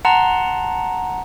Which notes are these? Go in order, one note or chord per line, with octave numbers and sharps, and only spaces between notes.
F#5 A5 A#5 C6